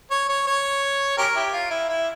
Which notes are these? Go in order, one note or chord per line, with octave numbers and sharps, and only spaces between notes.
C#5
C#5
C#5
C#4 G4 A#4
E4 G4
F4
E4
E4